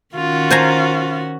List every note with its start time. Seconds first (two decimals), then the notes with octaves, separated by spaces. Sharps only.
0.16 D#3 C#4 F4 F#4
0.51 C5 G#5 A#5